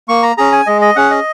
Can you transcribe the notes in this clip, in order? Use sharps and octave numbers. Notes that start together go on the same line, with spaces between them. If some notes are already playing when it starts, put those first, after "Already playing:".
A#3 C#6
A#5
C#4 G#4 A#5
G#5
G#3 D#5
D#5
C#4 G#4 F#5
D#5